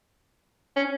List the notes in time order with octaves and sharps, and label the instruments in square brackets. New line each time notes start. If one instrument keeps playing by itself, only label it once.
[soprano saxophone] C#4